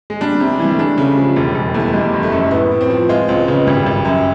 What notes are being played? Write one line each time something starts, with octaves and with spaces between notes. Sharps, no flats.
G#3
G3 D4
G3
C3
G#3
E3
G3
A3
G#3 D4
C#3 A3
F3 G#3
E1 G3
E1 G#3
E2 A3
G3 G#3
F#1
A3
F#2
A2 B3
A2
C4
F3
G#3 F4
C#2 C4
C#3 B3
G#1 G3
G#1
F#2